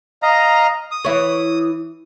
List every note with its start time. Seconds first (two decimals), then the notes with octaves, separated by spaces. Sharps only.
0.23 D#5 F5 A#5
0.91 D#6
1.05 E3 E4 C#5